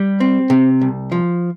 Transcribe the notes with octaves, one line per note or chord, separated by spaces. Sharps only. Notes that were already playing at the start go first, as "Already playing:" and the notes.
Already playing: G3
C4
C3
C2
F3